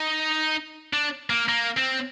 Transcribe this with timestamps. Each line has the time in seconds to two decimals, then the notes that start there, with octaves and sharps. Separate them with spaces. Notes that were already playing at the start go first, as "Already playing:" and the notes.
Already playing: D#4
0.94 D4
1.30 A#3
1.49 A#3
1.77 C4